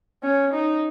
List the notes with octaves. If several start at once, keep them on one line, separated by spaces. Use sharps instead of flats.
C#4
D#4